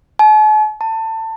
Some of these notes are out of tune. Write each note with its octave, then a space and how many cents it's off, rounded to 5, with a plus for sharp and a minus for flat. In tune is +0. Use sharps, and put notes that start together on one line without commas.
A5 -45
A5 +25